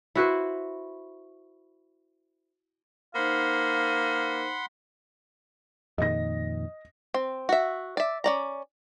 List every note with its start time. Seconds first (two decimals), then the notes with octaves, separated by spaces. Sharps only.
0.16 E4 F#4 B4 C5
3.15 A#3 D#4 C5 F5 F#5 B5 C6
5.98 F2 A#2 D#3 D#5 A#6
7.14 C4
7.49 F#4 E5
7.97 D5 E5
8.24 C#4 D5 A#5